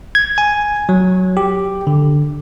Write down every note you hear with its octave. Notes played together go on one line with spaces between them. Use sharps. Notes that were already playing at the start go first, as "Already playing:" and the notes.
G#6
G#5
F#3
G4
D3